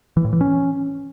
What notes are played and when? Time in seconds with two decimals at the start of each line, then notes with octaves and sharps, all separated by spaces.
0.17 E3
0.25 A2
0.33 E3
0.41 C#4